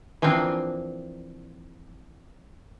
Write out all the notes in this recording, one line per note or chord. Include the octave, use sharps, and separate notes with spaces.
E3 F3 A#3 C4 D4